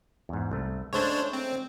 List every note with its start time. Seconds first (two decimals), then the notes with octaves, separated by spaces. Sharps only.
0.29 E2 G#2
0.51 C2 A3
0.93 C#3 G#3 A3 D4 C5 C#5
1.33 C4